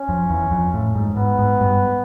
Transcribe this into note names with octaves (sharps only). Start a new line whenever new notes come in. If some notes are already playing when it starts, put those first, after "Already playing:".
Already playing: C#4
F2
E2
F2
A2
G#2
G#2 B3
G#2
G2